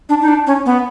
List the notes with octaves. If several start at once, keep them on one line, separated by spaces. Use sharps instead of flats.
D4
D#4
D4
C#4
B3